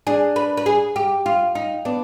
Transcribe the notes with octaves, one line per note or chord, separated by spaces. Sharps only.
D4 G#4
B4
B4
G#4
G4
F4
D#4
B3 D4